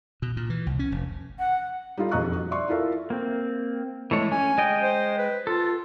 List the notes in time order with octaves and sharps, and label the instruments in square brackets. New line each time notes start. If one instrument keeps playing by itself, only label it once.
[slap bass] B2
A#2
E3
C2
C#4
F1
[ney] F#5
[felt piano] G3 D#4 F4 A4
E1 F2 D#5 A#5 C#6 F#6
F#4
D5 E5 C6 C#6
E4 F4 A4 A#4 E5 F5
[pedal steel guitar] A#3 C4
[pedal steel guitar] E3 A3 C#5 [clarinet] G#3
[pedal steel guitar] C#4 [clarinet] G#5
[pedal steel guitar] G#3 D#5 G5
[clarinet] C5
B4
[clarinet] F4 [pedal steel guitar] A4